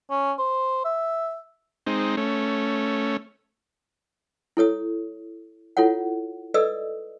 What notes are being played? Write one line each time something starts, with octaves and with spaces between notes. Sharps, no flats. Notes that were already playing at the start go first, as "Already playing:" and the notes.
C#4
C5
E5
G#3 C4 D#4
A3 C#4
E4 A4 C#5 D#6
E4 F4 A4 C#5 F#5
A4 B4 D5 D#5 D#6 E6